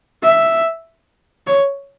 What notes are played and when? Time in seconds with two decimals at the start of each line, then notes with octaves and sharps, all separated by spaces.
0.24 E5
1.47 C#5